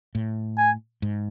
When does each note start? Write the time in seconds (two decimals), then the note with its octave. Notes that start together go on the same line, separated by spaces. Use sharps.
0.15 A2
0.58 G#5
1.02 G#2